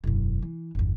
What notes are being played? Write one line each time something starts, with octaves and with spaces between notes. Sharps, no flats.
E1 F#2
E3
G1 E2